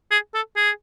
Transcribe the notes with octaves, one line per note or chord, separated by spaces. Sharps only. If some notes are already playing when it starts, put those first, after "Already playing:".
G#4
A4
G#4